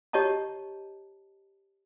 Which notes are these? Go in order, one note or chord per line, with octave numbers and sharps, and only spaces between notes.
G4 C#5 D#5 A5 A#5